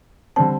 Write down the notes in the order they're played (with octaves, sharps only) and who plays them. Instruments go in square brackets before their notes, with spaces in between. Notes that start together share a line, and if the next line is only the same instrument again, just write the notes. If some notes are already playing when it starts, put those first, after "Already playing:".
[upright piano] D3 G3 C4 [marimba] A5